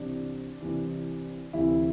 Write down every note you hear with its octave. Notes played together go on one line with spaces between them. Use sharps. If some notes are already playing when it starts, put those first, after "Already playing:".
Already playing: C2 C3 E3 D4
C2 C3 E3
D2 C3 E3 E4